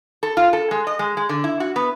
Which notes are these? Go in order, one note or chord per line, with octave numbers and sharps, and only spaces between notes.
A4
F4
A4
G#3
D#5
G#3
G#3
D3
E4
F#4
B3